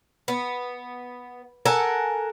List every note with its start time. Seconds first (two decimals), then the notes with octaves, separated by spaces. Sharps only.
0.28 B3
1.66 A4 A#4 F#5 G#5